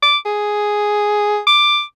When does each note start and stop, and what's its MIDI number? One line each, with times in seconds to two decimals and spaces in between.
0.02 0.17 86
0.26 1.39 68
1.47 1.82 86